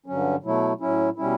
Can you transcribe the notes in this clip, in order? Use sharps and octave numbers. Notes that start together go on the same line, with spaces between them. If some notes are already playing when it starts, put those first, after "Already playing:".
G2 D3 F#3 C#4
B2 F#3 A3 E4
A2 F#3 C#4 E4
B2 G3 C#4 E4